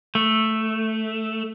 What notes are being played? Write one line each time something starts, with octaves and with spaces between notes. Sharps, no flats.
A3